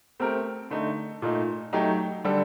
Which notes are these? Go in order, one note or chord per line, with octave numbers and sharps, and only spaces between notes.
A3 C4 G4 A#4
D3 A3 D#4
A#2 A3 D#4
F#3 A3 D#4 G4
D3 G3 D4 A4